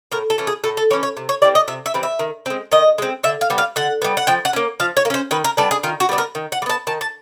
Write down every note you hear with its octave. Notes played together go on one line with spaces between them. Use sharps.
A2 A#4
A4
E3 A3 C#4
G#4
A2 A4
A4
E3 A3 C#4 C#5
C#5
C3
C#5
E3 G3 C4 D5
D#5
C3 E5
E5
E3 G3 C4
E5
D#3
G#3 C4
D#3 D#5
G#3 C4
D3 E5
F5
G3 B3
F5
D3 F#5
G3 B3
F#5
F3 G5
F#5
A#3 C#4
F3 F5
C#5
A#3
C#4 C5
D#3 B4
A#4
G3 B3 D4 A4
G#4
D#3 F4
F#4
G3 B3 D4
A#4
D#3
F#5
G3
B3 A5
D#3 A5
A5